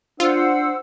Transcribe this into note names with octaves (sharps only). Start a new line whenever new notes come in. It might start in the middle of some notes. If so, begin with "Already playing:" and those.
D4 F4 C5 F#5 E6